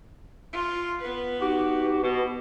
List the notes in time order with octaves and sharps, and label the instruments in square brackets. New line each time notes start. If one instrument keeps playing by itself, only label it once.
[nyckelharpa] F4
B3 B4
[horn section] D#4 F#4 G4
B2